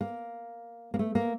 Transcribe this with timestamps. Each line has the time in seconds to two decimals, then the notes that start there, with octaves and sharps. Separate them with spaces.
0.01 A#3
0.94 A#3
0.99 A3
1.15 A#3